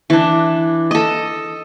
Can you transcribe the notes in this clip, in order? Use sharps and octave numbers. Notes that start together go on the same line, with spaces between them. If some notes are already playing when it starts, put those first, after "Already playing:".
E3 D4
A4 D#5